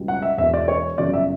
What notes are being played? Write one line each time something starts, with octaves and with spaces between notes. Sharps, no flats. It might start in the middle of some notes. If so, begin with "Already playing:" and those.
Already playing: C#2 B2 G3
F#5
E5
E1 E2 B2 E5
D5
C#5
G1 F#2 C#3 D5
E5